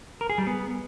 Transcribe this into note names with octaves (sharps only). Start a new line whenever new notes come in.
A#4
G#4
G3
B3